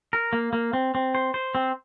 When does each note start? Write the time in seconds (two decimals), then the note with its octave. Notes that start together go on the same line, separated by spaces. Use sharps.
0.13 A#4
0.33 A#3
0.53 A#3
0.73 C4
0.95 C4
1.15 C5
1.34 C5
1.55 C4